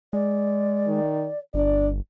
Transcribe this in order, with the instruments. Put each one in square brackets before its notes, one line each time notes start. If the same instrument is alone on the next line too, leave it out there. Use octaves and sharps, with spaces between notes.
[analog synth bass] G#3 [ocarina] D5
[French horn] D#3
[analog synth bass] G1 [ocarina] D4 [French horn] D5